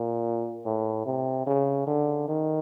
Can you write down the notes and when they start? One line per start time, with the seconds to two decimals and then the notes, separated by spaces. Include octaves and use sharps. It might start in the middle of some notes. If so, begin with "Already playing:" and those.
Already playing: A#2
0.65 A2
1.06 C3
1.47 C#3
1.87 D3
2.28 D#3